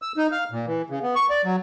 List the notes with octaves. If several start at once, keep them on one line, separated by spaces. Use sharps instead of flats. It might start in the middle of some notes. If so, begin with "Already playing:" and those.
E6
D#4
F5
A#2
E3
C#3
B3
C#6
D5
F#3